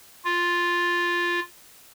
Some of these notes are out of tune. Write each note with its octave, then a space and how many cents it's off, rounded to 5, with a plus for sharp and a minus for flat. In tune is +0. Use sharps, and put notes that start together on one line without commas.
F4 +0